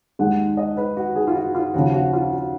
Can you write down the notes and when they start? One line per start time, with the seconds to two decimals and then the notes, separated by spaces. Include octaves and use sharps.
0.19 D#2 D#3 G#3 F#5
0.57 D#5
0.77 B4
0.97 F#4
1.16 G#4
1.27 F4
1.35 F#4
1.55 F4
1.74 D#2 C#3 F3 F#4
1.93 F#4
2.13 F4
2.33 F#4